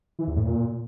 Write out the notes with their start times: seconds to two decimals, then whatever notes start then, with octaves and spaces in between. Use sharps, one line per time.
0.19 E3
0.27 E2
0.36 A2
0.44 A#2